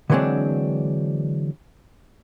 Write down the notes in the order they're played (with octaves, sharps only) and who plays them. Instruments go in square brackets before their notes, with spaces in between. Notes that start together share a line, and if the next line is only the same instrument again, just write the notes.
[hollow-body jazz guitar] D3 E3 F#3 G#3 C4 D4